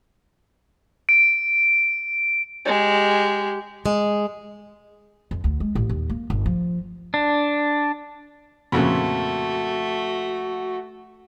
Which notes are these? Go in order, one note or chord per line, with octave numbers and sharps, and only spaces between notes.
D7
G#3 G4
G#3
F2
D2
G#3
A1
D#2
A#3
G1
F3
D4
F2 A#2 C#3 A3 F#4